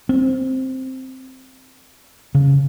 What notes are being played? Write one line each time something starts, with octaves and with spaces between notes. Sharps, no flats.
C4
C#3